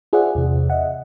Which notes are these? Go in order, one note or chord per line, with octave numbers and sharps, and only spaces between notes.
F4 G#4 C5 D5 E5 F#5
E2 C3
D#5 E5 F#5